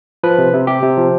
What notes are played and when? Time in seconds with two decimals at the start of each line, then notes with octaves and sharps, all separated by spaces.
0.23 F3 B4
0.38 C3
0.54 C3
0.67 C3 G4
0.82 C3
0.97 F3